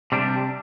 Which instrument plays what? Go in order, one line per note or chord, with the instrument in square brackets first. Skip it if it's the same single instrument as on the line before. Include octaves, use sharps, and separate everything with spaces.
[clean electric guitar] C3 G3 D4